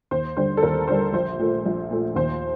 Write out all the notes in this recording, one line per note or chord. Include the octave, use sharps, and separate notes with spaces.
D#2 C5
D3 G3 C5
A4
D#2 A#4
D3 G3 C5
A#1 C5
A#2 A3
A#1
A#2 A3
D#2 C5